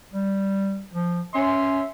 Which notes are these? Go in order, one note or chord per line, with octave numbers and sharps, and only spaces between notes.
G3
F3
C#4 E5 C6